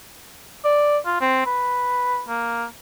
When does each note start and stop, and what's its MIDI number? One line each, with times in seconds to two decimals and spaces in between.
0.65 0.98 74
1.06 1.17 65
1.21 1.42 60
1.46 2.22 71
2.29 2.65 58